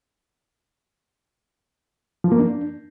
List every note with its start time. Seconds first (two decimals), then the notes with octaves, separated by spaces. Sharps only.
2.24 F3
2.32 A#3
2.39 D4